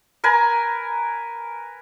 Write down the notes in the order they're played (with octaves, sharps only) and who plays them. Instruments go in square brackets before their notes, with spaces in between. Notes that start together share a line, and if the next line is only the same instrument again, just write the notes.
[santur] A#4 B4 G#5 A#5